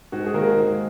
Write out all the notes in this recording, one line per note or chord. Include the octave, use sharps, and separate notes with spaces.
G#2 F#4
G#4
D#3 A#3 A#4
G#4
G#2